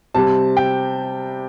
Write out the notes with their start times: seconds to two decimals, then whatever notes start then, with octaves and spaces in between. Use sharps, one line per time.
0.14 C3 G3 C4 A5
0.57 G5